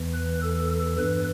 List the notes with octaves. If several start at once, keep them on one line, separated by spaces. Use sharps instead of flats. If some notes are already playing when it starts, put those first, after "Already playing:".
Already playing: E2 E3
B4
A4
A4
G2 E3 B4